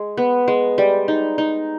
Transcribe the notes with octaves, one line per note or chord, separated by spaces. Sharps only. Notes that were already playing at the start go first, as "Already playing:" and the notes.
Already playing: G#3
B3
G#3
G3
D#4
D#4